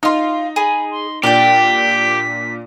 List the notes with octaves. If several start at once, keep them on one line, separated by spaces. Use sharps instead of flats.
D#4 F4 F5
G#4 B5
C6
A#2 D4 G4 D5 G5 B6